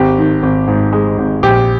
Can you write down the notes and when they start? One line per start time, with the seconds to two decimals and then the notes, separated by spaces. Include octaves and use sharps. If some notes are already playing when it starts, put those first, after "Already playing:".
Already playing: G#1 G4
0.18 D#3
0.43 G#1
0.67 G#2
0.93 G#3
1.18 G#1
1.43 A#1 G4